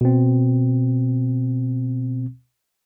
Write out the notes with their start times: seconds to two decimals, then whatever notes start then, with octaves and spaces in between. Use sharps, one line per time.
0.01 B2 C4